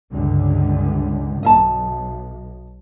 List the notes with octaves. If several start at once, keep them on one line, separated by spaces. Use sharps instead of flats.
C#2 G2 D3
B1 D#5 E5 A5